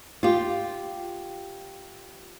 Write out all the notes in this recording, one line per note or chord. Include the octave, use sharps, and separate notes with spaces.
F4 G4